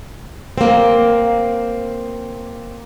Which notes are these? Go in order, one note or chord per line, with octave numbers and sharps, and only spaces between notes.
A#3 C4